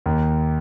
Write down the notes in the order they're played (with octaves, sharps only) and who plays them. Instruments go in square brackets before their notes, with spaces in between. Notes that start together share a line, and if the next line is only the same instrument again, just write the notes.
[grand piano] D#2